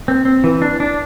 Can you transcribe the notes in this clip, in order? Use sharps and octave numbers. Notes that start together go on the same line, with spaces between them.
C4
C4
E3
D4
D4